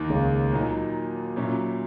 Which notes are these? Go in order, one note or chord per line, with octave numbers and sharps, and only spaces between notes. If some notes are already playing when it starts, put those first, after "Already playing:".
Already playing: D#2 D#3 A#3
C#2 C#3
A#2 F#3 A#3 D#4
A#2 F#3 C#4 E4